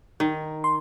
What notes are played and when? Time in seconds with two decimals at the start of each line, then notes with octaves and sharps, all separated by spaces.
0.20 D#3
0.64 C6